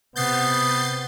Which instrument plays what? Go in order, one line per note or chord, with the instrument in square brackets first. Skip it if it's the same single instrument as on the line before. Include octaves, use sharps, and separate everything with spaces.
[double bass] C3 [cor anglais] B3 [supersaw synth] G6 A6 C7